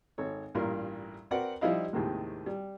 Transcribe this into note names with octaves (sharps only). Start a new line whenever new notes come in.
G#1 A4 C#5
A1 G2 A#2 A#4 C6
C4 F#4 A#4 B4 D5 F#5
F3 G3 D#4 E4 D#5 F5
D#2 A2 C3 D#3 G#3
G3